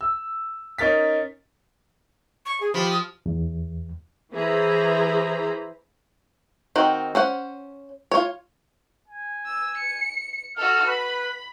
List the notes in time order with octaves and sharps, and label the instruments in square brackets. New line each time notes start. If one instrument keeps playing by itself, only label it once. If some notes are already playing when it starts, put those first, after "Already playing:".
[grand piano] E6
C#4 D#4 A#4 A6 B6
[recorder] C#6
G#4
[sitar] F3 [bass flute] G4 [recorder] B5
[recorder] D#6
[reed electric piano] E2
[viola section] E3 G#4 C5 A#5 B5
[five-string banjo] D#3 C4 F#4
C#4 C5 F#5
F4 C#5
[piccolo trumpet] G#5
[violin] E6
C#7
[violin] F#4 A4 [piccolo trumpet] F6
[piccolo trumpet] B4 [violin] B5